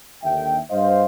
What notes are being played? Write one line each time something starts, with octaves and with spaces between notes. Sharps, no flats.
D#2 D3 E5 G5
G2 C5 D#5 F5